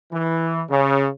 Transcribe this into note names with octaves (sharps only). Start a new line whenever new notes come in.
E3
C#3